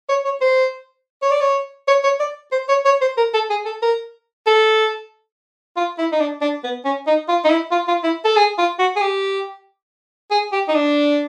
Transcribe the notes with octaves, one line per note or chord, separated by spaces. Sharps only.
C#5
C#5
C5
C#5
D5
C#5
C#5
C#5
D5
C5
C#5
C#5
C5
A#4
A4
G#4
A4
A#4
A4
F4
E4
D#4
D4
D4
B3
C#4
D#4
F4
D#4
E4
F4
F4
E4
A4
G#4
F4
F#4
G#4
G4
G#4
G4
D#4
D4